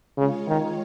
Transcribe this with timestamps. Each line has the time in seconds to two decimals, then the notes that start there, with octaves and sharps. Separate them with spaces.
0.17 C#3 G#3 F4 C#5
0.48 D#3